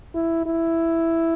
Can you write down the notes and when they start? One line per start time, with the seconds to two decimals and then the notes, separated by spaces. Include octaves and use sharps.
0.15 E4
0.46 E4